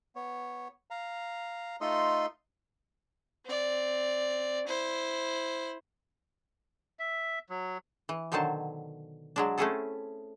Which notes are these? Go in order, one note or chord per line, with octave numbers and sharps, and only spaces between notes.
B3 C#5
F5 A#5
A3 D#4 F4 A4 D#5 C6
C4 D5
E4 C5
E5
F#3
E3
B2 D3 D#3 F#3 C5 A5
F#3 G#3 D4
A3 C4 C#4 E4 G#4 A4